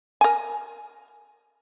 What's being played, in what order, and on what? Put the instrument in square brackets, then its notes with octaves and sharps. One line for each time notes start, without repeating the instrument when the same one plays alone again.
[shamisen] A#4 G#5